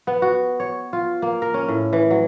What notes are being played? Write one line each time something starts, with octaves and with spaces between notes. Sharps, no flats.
B3
F#4
C#5
F4
A#3
A#4
C#4
A2
E3
F#3